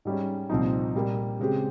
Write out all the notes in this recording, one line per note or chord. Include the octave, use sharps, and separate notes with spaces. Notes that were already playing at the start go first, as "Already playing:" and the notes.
G#2 G3 C#4
C2 A#2 F3 C4 D#4
A#2 G3 A#3
C#3 G#3 C4 G4